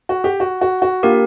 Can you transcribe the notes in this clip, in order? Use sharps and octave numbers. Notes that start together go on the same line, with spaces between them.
F#4
G4
F#4
F#4
F#4
A#3 D4 F4 G4 A#4